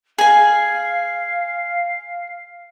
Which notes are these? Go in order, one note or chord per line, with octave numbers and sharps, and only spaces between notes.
G#4 F5 G#5